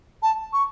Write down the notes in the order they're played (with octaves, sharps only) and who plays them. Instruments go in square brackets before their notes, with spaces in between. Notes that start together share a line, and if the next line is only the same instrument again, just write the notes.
[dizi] A5
C#6